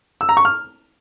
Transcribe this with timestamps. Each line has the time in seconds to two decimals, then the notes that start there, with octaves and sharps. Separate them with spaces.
0.21 E6
0.29 A#5
0.37 C#6
0.45 F6